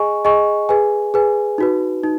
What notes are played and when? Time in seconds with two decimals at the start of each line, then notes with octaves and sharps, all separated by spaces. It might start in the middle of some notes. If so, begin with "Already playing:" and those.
Already playing: G#4 D#5 G#5 C#6
0.25 G#4 D#5 G#5 C#6
0.69 G#4 B4 G#5
1.14 G#4 B4 G#5
1.58 D#4 F#4 B4
2.04 D#4